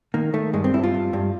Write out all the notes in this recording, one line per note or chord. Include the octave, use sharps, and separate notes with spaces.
D#3 A#3
D#3 A3
G2 G#3
C4
G2 E4
F4
G2
G2